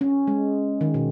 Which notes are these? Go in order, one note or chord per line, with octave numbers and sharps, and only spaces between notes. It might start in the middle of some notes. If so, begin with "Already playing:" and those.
C#4
G#3
D#3
B2